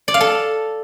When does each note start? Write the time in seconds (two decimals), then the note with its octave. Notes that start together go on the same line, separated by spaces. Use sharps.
0.08 D5
0.14 F5
0.20 A4